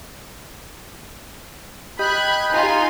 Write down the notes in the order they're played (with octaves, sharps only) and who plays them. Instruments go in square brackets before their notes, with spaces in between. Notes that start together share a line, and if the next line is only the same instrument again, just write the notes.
[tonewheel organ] G4 D#5 G5 [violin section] B5 F#6 G#6
[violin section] D#4 F4 G#5